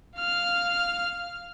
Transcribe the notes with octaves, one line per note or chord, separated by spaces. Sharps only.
F5 F6